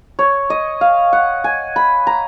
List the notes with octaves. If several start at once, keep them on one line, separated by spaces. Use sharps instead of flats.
C#5
D#5
F5
F#5
G#5
B5
A#5